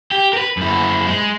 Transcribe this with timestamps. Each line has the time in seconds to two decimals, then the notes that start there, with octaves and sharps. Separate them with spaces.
0.12 G4
0.33 A#4 B4
0.57 F#2 E4
1.07 G#3